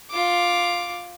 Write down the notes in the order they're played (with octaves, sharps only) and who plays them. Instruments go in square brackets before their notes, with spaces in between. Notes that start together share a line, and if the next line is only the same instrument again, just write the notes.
[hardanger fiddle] F4 D6